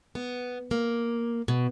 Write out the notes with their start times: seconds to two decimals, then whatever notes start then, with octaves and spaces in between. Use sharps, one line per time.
0.15 B3
0.71 A#3
1.48 B2